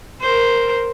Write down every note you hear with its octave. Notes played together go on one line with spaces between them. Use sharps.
A#4 C5